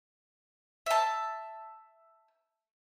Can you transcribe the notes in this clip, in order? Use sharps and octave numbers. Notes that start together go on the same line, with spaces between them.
E5 A5